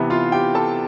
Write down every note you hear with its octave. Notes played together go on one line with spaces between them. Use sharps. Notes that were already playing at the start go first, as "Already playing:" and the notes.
Already playing: C3 E3 B3
F4 F5
G4 G5
A4 A5